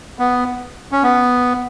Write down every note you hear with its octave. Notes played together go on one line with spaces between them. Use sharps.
B3
C#4
B3